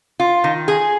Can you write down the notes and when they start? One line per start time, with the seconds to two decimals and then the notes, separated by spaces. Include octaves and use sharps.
0.20 F4
0.44 D#3
0.68 G#4